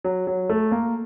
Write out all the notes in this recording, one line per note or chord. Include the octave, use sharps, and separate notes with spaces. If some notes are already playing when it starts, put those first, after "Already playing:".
F#3
F#3
A3
A#3